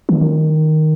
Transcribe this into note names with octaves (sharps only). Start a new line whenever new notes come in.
D#3